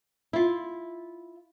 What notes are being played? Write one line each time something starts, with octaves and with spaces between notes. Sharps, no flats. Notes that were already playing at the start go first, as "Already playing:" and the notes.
E4 F4